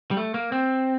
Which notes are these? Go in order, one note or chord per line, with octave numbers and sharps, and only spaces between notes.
G3
A3
A#3
C4